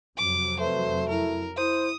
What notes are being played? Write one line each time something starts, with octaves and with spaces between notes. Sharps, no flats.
F2 C3 F#3 D6
A3 B4 C5
E4 A#4
E4 C5 D#6